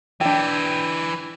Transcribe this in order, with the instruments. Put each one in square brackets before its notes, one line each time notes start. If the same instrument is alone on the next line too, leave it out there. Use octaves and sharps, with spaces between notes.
[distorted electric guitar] E3 G4 [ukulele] D4 G5